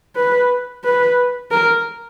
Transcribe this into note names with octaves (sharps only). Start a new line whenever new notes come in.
B4
B4
A#4